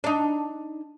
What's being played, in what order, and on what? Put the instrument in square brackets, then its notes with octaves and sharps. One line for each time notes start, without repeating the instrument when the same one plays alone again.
[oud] D4 D#4